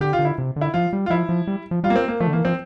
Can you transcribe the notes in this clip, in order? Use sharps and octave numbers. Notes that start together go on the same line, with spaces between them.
D3 G4
F4
D3
E4
C3
D3
E4
F3 F4
G3
F4
F3 E4
F3
G3
F3
G3 F4
A#3
C4
A#3
F3 A3
D3
E3 A#3
F3 C4